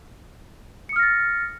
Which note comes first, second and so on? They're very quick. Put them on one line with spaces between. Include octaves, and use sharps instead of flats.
C#7 D#6 F6 A#6 A6